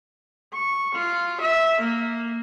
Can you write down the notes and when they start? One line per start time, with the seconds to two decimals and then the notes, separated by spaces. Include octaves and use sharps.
0.53 C#6
0.95 F4
1.41 E5
1.80 A#3